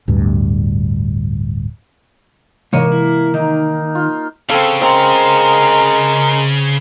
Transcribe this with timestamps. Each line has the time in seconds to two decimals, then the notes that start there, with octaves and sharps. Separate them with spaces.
0.08 D1 D2 G2
2.73 G#2 C3 E3 G#3 A#3 C#5 D#5
2.92 E4
3.34 D#3 D#4
3.95 F4
4.50 C#3 C4 A4 F5
4.81 G#3 C4 A#4 C6